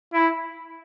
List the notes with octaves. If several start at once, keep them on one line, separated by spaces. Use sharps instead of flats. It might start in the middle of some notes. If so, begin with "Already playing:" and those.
E4